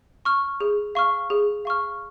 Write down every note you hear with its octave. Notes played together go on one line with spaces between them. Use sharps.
C#6 F6
G#4
F5 C#6 F6
G#4
F5 C#6 F6